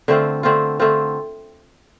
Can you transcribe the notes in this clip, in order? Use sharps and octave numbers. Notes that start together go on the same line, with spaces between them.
D3 A3 C4 F4
D3 A3 C4 F4
D3 A3 C4 F4